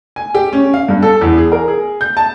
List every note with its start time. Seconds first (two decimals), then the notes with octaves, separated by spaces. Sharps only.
0.16 G#5
0.35 G4
0.53 C#4
0.74 F5
0.89 G2
1.03 A4
1.21 E2
1.38 G#4
1.52 A#4
1.68 G#4
2.01 G6
2.17 A5